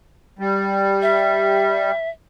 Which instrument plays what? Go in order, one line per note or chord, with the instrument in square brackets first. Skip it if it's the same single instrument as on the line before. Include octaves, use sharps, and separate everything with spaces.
[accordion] G3
[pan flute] E5